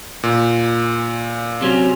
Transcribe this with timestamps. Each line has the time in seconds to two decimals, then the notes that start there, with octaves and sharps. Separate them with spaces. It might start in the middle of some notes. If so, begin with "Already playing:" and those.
0.23 A#2
1.61 C3 F#3 C#4